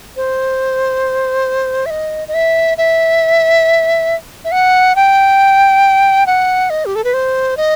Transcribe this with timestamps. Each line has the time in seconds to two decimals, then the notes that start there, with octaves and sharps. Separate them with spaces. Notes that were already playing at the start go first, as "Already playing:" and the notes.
0.17 C5
1.86 E5
1.90 D#5
2.28 D#5
2.34 E5
2.78 E5
4.45 E5
4.52 F#5
4.96 G5
6.26 F#5
6.70 D#5
6.86 G4
6.95 A4
7.04 B4
7.14 C5
7.57 D#5